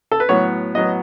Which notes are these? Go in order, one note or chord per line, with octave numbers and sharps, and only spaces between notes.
A4
B4
A2 F#3 B3 C#5
A2 F#3 B3 D#5